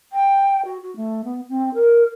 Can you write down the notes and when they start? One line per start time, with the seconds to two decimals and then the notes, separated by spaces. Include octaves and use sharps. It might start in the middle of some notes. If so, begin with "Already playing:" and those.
0.12 G5
0.65 F#4
0.82 F#4
0.96 A3
1.24 B3
1.49 C4
1.74 A#4